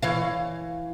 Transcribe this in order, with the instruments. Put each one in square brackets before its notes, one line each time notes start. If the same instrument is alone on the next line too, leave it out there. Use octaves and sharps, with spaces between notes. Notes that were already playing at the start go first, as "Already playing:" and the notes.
[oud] E3 C#5 F5